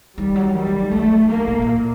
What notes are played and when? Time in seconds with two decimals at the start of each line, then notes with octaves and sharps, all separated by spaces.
0.18 D#3 G3
0.36 F#3
0.54 D#3 G3
0.67 D#3
0.92 F#3 A3
1.11 D#3
1.29 D3 A#3
1.47 A#2
1.62 A2
1.67 A#2